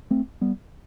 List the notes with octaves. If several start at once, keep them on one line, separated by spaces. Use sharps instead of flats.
A3 C4
G3 B3